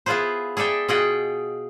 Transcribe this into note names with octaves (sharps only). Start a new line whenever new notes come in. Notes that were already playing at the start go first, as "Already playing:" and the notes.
B3 E4 F4 G#4 B4 C5
G#4 A4 D5 E5 G5
B2 F4 G#4 D#5 F#5 G5